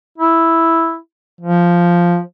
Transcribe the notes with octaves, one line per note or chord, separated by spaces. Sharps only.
E4
F3